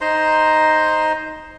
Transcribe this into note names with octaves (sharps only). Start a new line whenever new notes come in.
D#4 C5 A#5 C6